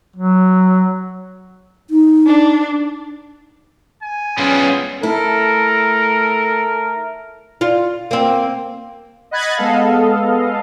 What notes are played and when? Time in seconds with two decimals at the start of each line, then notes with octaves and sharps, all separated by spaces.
0.16 F#3
1.90 D#4
2.26 D4
4.02 G#5
4.38 B1 G3 B3 C#4 F4 G#4
5.03 A3 E4 A4 A#4
7.61 F4
8.11 A#3 C4
9.31 D#5 F#5 B5 F#6 G#6 A6
9.57 G#3 B3 A4 D#5 F5